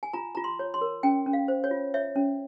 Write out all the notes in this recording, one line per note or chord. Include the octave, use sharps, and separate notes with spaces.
G#5
F4 A#5
F4 A#5
C6
C#5
C6
A#4
C#4 G5
C#4
F5
C5
C#5
F4
C#5 E5
C#4